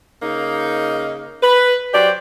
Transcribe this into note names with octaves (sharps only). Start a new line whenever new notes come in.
C#3 A#3 D#4
B4
F#3 G4 C5 D5